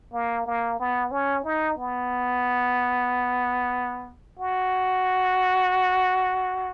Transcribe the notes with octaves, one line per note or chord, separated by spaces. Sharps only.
A#3
A#3
B3
C#4
D#4
B3
F#4